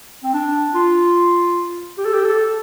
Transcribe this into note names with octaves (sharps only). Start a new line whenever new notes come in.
C4
D4
F4
G4
A4
G4
A4